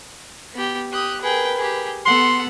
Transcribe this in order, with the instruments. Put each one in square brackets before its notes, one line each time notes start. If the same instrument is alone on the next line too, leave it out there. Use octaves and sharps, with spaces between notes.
[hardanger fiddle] B3 G4
[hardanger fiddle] G4 [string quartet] D#6 F#6
[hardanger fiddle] G#4 G5 [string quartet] A#4 B4
[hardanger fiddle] G4 G#4
[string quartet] B3 [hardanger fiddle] A4 F#5 [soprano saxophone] C6